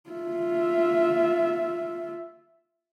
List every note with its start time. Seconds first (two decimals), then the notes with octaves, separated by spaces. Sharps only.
0.11 F4 E5